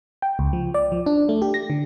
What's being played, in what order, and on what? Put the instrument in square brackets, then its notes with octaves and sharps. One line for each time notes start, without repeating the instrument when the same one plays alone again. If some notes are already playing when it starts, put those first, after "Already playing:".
[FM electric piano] G5
C#2
F3
D5
F3
D4
A3
G4
A#6
D3